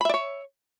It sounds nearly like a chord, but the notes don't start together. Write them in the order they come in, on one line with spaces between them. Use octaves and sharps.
B5 E5 D5 C#5